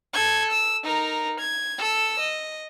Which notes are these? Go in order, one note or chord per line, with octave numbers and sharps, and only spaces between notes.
A4 G#6
E6
D#4 A#4
G#6
A4 E6
D#5